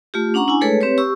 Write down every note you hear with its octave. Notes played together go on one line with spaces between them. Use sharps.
A3 F4 G4
C#4 D4 F#5 A#5 C#6
D4 E4 G#5
G#3 A3 G#4 A4 B4 C#5
C4 G4 B4 C#5
G4 C#6 E6